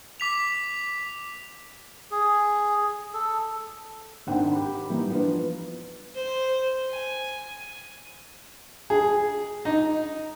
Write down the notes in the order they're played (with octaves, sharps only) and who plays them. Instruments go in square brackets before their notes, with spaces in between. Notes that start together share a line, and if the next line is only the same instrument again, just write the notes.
[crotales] D6 B6 F7
[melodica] G#4
A4
[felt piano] G#1 G#2 D4 F#5 G5
G4 B5
E3 G3 D#4
F3 B3 D4 F4 B4
[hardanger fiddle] C5
G#5
[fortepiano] G#4
D#4